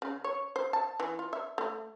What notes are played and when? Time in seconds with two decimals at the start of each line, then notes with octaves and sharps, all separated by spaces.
0.02 C#3
0.24 C#5
0.56 C5
0.73 A5
1.00 E3
1.19 F4
1.33 E5
1.58 A3